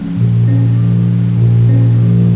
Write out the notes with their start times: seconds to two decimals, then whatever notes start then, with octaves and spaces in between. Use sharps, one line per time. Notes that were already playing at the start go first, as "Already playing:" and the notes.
Already playing: F3 G#3 C#4
0.17 A#2
0.48 C#4
0.77 F3
1.07 G#3
1.38 A#2
1.69 C#4
1.98 F3